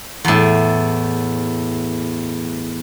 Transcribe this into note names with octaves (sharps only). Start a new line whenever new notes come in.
E2 A2